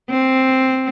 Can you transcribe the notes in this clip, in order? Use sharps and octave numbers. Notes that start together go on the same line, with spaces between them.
C4